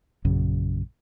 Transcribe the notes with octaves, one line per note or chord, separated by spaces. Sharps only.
A#1 F#2 C#3